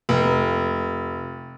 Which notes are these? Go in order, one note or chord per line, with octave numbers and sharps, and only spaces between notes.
F1